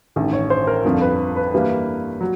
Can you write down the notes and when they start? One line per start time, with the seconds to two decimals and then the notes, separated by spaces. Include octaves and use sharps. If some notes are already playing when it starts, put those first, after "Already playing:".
0.16 A1 G2 D#3
0.33 C#5
0.50 C5
0.67 A#4
0.84 G1 F2 D3 F3
1.02 B4
1.36 B4
1.53 G2 E3 G3 A#3
2.21 F#3